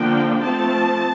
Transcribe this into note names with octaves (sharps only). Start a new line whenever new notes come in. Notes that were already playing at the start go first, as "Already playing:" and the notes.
Already playing: D3 F3 A#3 D4 G5
F3 A3 C4 A5